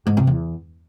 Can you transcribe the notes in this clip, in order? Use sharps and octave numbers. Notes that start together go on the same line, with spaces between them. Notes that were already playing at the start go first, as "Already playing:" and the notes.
G#2
C3
E2